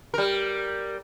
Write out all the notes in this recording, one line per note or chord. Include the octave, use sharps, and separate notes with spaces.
G3 A#4